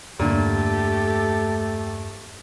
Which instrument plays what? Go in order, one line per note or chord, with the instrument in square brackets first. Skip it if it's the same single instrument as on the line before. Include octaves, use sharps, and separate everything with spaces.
[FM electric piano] E2 G2 [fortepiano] A#2 D3 [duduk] A3 [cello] G4 A4